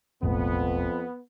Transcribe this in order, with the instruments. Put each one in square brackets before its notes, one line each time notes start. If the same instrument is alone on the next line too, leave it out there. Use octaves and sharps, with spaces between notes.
[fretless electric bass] E1 A1 A2 [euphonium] F2 [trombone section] B3